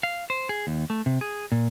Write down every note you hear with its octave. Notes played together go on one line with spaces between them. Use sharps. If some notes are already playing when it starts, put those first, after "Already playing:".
F5
C5
G#4
D#2
A3
C3
G#4
A#2